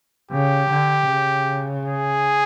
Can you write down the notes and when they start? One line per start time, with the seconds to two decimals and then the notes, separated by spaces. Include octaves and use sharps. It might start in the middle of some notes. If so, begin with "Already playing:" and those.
0.31 C#3 G4
0.69 D3
1.08 C#3
1.85 G#4